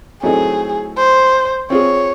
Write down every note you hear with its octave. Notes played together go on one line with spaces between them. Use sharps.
A2 F#3 A3 C4 D#4 G#4
C5
C4 F4 G#4 C#5